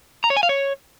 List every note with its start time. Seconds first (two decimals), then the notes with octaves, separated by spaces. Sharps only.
0.24 A#5
0.30 C#5
0.37 G#5
0.43 F5
0.49 C#5